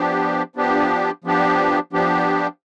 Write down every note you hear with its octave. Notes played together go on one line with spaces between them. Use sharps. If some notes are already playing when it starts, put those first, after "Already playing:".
Already playing: F3 B3 D4 G4
F3 B3 D4 G4
F3 B3 D4 G4
F3 B3 D4 G4